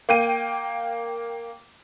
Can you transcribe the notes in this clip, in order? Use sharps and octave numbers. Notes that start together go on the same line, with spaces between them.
A#3 G5 D#7